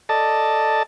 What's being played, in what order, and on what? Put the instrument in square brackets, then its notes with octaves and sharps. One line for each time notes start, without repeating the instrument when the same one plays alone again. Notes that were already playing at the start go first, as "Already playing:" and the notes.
[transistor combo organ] A4 D5 D#5 A5